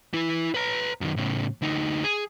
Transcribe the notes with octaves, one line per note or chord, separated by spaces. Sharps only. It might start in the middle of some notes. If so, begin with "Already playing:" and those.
E4 B4
B4 A#5
F#2 D#3
A2 C#3
D2 D#4
G#4